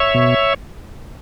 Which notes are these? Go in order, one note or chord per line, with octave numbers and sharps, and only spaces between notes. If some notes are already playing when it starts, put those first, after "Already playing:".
Already playing: C#5 E5
B2